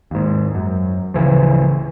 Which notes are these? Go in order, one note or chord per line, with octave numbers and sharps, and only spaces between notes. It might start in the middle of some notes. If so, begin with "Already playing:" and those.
D#2 G#2
F#2
D1 C#3 E3 F3